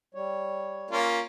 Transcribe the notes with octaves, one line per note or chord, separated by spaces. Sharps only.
G3 C#5
A#3 C#4 F4